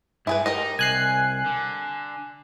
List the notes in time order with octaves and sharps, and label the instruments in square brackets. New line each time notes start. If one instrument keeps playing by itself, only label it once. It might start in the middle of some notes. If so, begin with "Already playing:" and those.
[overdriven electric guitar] G2 [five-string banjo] E4 G#4 B4
[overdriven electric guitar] D#4 [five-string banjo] G4 A#4 D#5
[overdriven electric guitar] C2 [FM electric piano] G#5 F#6 C7
[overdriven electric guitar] D3